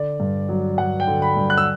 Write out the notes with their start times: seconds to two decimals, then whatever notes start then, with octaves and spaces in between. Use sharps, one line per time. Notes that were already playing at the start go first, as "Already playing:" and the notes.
Already playing: D3 D5
0.20 G2
0.49 F#3
0.78 G2 F#5
1.00 G5
1.07 D3
1.22 B5
1.37 G2
1.50 F#6
1.58 E6